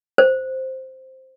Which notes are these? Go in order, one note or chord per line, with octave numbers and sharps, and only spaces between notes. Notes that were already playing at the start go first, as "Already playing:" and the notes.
C5